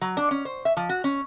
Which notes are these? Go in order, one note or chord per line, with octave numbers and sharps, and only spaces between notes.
F#3
D4
C#4
C5
E5
F3
F#4
C#4